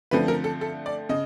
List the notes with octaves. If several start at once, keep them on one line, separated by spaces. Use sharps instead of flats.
D3 F3 A3 C4 B4
A#4
A4
A4
D5
C#3 D#5